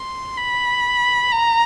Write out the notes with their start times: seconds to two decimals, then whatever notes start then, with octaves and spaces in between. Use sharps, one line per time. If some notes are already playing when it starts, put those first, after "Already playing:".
Already playing: C6
0.37 B5
1.32 A#5